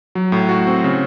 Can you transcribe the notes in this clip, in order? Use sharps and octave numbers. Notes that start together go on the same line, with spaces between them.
F#3
A2
F#4
C4
C#3